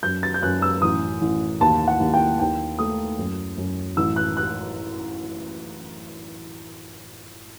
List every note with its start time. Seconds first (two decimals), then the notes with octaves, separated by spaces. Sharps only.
0.03 F#2 G6
0.23 A6
0.34 G6
0.42 F#2 F#6
0.62 E6
0.82 A1 D#6
1.21 A1
1.60 D#2 A5
1.88 F#5
2.00 D#2
2.14 G5
2.39 D#2 G5
2.79 A3 D#6
3.18 F#2
3.58 F#2
3.97 A1 E6
4.16 F#6
4.37 F#6